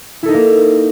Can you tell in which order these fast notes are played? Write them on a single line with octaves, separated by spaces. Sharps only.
E4 A4 D#4 A#4 A#3